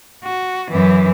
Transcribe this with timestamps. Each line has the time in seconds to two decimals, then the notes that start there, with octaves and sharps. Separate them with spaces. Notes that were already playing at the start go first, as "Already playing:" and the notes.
0.24 F#4
0.71 F#2 E3